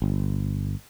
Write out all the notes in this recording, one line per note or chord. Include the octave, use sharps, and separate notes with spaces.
G1